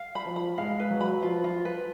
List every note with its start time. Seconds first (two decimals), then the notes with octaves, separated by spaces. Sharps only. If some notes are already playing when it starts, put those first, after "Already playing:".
Already playing: F5
0.15 B5
0.26 F3
0.36 B5
0.58 G#3 F5
0.80 B4
0.90 F#3
1.01 B5
1.22 F3 F4
1.44 F4
1.65 B4